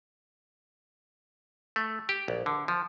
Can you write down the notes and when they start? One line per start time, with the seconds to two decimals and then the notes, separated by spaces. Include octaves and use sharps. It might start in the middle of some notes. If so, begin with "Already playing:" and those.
1.76 A3
2.09 G4
2.28 A#1
2.46 D3
2.68 F3